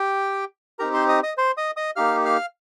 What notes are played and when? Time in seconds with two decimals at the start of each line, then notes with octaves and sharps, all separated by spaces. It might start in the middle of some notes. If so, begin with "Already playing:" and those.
Already playing: G4 G5
0.79 C4 D#4 G4 A#4 A#5
0.94 C5 C6
1.09 D#5 D#6
1.23 D#5 D#6
1.38 C5 C6
1.57 D#5 D#6
1.77 D#5 D#6
1.96 A#3 D#4 G4 F5 F6
2.25 F5 F6